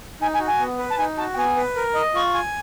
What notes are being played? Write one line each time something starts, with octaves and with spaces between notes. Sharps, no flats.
D#4 G#5
G#5
F#4
G#5
B3
B4
A5
D#4 G#5
F#4 A5
G5
B3 G#5
B4
A#4
D#5
F4 C#6
G#5